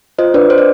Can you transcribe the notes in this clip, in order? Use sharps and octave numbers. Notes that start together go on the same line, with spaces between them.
F4 C5 D#5
D4 B4 D5
D4 C5
D5